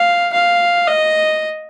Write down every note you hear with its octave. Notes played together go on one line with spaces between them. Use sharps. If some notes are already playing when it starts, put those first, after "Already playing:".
Already playing: F5
F5
D#5